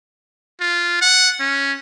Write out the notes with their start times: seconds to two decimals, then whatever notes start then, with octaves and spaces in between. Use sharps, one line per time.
0.60 F4
1.01 F#5
1.39 C#4